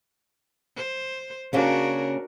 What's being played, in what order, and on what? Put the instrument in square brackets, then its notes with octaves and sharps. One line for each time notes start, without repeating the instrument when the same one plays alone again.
[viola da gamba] C5
[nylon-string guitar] C#3 A#3 C#4 [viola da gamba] D4 F#4 A#4